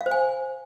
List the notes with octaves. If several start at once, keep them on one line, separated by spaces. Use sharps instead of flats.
F5
C5
G#5